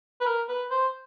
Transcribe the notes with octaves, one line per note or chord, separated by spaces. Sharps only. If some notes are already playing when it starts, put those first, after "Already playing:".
B4
A#4
B4
C5